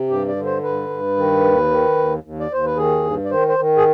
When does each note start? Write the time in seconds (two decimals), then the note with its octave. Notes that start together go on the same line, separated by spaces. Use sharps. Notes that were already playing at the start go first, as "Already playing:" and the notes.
Already playing: C3
0.09 G2 G4
0.28 D5
0.36 D3
0.45 C5
0.63 G2 B4
0.90 G2
1.17 D#3
1.44 D#2
1.71 D#3
1.97 D#2
2.23 D#2
2.40 D5
2.51 D#2 C5
2.65 B4
2.77 D#3 G#4
3.05 G2
3.25 D5
3.30 D#3 C5
3.48 C5
3.58 D#3
3.77 G#4